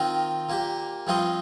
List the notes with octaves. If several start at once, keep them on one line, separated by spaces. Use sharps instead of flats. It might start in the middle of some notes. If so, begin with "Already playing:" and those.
Already playing: D#3 C4 F4 A#4
A#2 A#3 G4
G2 F3 C4 F4 D#5